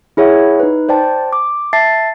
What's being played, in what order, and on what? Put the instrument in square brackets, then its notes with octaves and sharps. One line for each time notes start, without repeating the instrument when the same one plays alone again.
[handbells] E4 G#4 C#5 E5 F#5
D#4 B4
C5 D5 G5 A5
D6
E5 A5 A6 C7